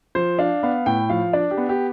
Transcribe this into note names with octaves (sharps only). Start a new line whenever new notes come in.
F3 C5
D4 F5
B3 F5
A2 G5
F3 F5
D4 D5
G4
B3
G4